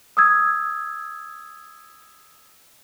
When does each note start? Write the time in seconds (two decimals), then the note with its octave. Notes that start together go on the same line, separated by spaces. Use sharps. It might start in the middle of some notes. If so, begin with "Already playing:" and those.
0.17 D#6 E6 G#6